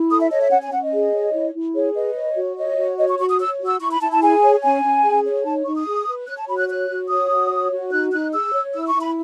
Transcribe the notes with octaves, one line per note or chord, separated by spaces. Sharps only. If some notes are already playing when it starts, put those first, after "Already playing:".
Already playing: E4
A4 D#6
E5
C#5 D#5
E5
C#4 F#5
G#5
C#4 F#5
D#5
G#4
C#5
E4
E4
G#4 C#5
B4 D#5
C#5
F#4
C#5 D#5
F#4
C#5 D#5
C#6
F#4 C#6
D#6
C#5 E6
F#4
E6
E4 C#6
B5
E4 A5
A5
G#4 G#5
C#5
C#4 G#5
C#4
G#4
C#5
D#4 A5
D#4 C#6
D#6
G#4
B4
C#5 F#6
A5
F#4 B5
F#6
C#5 F#6
F#4
C#5 D#6
F#4
C#5
F#4
D#4 F#6
D#4 F#6
G#4 E6
C#5
E4 E6
C#6
E4
B5